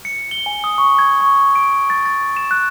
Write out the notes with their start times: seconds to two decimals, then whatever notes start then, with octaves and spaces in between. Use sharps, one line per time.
0.05 C#7
0.31 G7
0.46 G#5
0.64 D#6
0.78 C#6
0.99 G#6
1.20 C#6
1.55 D7
1.90 A6
2.06 A6
2.37 E7
2.51 F#6